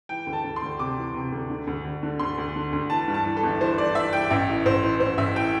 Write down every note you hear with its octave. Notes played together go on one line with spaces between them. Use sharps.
E3 G5
D2
A5
D2
C6
D2
C3 D6
E3
C3
D2
D3
D2
D2
D3
D2 C6
D2
D3
D2
E3 A5
G2
A5
E3
A4
G1
E3 C5
E3 D5
E3 E5
E3 G5
A1 E5
A2
A1 C5
E3
A1 C5
A1 E5
A2 G5